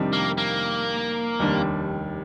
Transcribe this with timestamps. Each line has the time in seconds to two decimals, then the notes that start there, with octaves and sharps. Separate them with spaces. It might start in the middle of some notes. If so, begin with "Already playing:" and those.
Already playing: F2 C3 D#3 G3 D4
0.13 A#3
0.38 A#3
1.39 F1 D#2 D#3 G3 D4